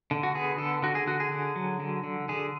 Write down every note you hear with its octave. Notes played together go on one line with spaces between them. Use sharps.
D3
F#4
B3 G#4
D3 A4
D3 F#4
G#4
D3 F#4
G#4
D3
F#3
D3
D3
D3 G#4